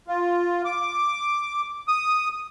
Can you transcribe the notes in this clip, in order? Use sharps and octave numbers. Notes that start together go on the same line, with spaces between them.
F4
D6
D#6